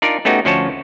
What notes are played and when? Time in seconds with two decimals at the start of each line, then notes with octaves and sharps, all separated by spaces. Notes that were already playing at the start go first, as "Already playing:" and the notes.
0.02 D4 D#4 F4 A#4 D5
0.25 A3 B3 C#4 D#4 F#4 G4
0.45 D2 F3 C#4 F#4 C#5 A5